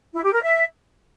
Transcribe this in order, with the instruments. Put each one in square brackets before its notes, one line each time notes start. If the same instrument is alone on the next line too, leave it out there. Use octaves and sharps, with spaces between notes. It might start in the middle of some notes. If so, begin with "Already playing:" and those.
[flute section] E4
G4
A#4
E5